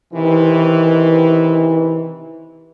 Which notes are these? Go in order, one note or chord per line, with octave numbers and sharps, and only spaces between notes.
C3 D#3 E3